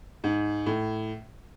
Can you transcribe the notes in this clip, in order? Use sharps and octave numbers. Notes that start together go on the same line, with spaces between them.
G#2
A2